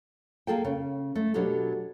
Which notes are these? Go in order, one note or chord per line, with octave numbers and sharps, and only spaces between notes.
A#3 G#4 A4 G5
C#3
A3
B2 F#3 D4 G4 A4